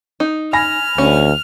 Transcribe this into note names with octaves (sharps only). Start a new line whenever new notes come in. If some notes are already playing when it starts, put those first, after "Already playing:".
D#4
G#5 B5 F6 A#6
D2 C#4